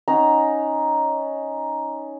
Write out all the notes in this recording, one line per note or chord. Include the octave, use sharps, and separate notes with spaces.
C#4 D#4 F#5 A#5